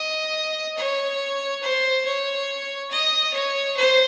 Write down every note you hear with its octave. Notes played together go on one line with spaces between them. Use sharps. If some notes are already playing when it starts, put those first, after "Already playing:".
Already playing: D#5
C#5
C5
C#5
D#5
C#5
C5